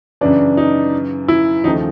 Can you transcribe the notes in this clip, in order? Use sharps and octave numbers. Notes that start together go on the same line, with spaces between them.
F#2 C#3 E3 D4
D#4
E4
D#2 C#3 F3 A3 D#4